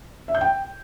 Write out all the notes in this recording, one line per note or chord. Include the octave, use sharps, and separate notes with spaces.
E5
G6
G5